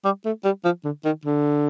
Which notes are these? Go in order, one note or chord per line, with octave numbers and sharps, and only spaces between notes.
G3
A3
G3
F3
D3
D#3
D3